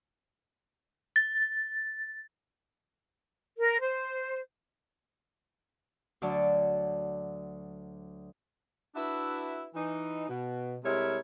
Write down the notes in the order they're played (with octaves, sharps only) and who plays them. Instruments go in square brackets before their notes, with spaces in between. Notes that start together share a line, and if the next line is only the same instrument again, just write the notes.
[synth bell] A6
[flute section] A#4
C5
[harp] D2 D3 F#3 D5 A5 C#6
[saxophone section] D4 E4 F#4 B4 E5
E3 D#4
B2
C3 G3 G#3 E4 A#4 C#5